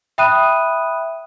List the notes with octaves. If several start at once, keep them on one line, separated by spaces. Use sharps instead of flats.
E5 G5 B5 D#6 F#6 D#7